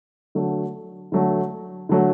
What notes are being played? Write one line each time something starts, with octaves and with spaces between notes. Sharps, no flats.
D3 F#3 A3
D3 F#3 A3
D3 F#3 A3